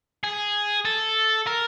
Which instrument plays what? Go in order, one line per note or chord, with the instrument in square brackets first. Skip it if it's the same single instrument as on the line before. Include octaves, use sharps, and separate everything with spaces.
[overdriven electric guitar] G#4
A4
A#4